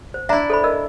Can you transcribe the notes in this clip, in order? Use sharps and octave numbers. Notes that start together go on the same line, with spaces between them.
C5
D4 E4 E5 A#5
A4 C5 B5
A#4 D#5 E6